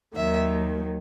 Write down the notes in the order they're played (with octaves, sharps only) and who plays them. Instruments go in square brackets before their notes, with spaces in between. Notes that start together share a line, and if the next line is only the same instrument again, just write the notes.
[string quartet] D#2 D#3 F#3 E5